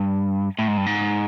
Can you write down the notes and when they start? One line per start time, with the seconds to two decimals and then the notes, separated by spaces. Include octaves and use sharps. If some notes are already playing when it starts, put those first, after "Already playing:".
Already playing: G2
0.59 A2
0.68 G#2
0.77 G2
0.86 G#2